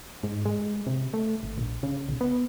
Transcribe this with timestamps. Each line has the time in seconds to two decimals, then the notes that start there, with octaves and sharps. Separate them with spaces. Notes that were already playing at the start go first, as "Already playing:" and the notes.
0.23 G#2
0.45 G#3
0.87 C3
1.14 A3
1.43 G#1
1.58 A#1
1.83 C#3
2.09 B1
2.21 B3